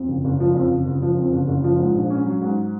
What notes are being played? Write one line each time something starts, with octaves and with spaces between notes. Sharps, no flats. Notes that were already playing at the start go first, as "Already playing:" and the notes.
Already playing: F2
F#1
F#1
F3
F2
F#1
F#1
F3
F2
F#1
F#1
F3
G#2
A#1
C#4
F#3
G#2